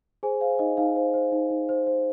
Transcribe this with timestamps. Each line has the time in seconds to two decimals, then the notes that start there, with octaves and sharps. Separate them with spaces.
0.23 G#4 C5 G#5
0.41 C5 F5
0.59 D#4 D#5
0.77 D#4 F5
0.96 C5
1.14 C5
1.32 D#4
1.50 D#4
1.69 C5
1.87 C5